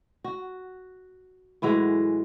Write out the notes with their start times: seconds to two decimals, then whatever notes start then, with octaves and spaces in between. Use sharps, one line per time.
0.24 F#4
1.62 A2 E3 F#3 G#3